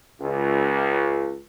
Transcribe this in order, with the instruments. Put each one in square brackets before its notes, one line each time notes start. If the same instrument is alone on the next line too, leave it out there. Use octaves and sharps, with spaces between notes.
[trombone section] C#2